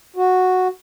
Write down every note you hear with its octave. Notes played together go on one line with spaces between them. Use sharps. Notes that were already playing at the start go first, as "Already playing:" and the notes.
F#4